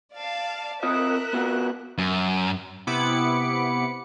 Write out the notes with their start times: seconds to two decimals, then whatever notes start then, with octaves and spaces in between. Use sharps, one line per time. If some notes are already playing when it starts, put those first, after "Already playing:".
0.15 D5 F5 A5
0.83 C4 F4 A#4 D#5 E5 F#6
1.33 B3 F4 F#4
1.98 F#2
2.87 C3 B3 E4 B5 D6 C#7